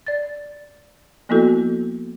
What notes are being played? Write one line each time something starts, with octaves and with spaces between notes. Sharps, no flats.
D5 A6
F3 A#3 B3 E4 F#4 A4